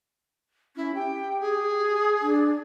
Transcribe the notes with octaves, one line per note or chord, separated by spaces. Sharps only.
C#4 E4
G4 G5
G#4
D4